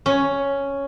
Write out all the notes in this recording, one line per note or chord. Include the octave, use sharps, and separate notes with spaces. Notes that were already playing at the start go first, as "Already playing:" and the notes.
C#4